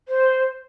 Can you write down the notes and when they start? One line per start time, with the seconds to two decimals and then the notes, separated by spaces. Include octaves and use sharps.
0.09 C5